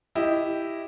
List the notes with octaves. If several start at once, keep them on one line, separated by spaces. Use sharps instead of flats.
E4 G4 D#5